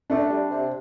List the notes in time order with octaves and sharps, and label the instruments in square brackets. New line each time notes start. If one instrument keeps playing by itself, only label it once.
[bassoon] A3 [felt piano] D4
[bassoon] G3
C3